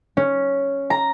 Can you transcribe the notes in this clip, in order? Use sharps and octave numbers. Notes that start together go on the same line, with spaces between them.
C#4
A#5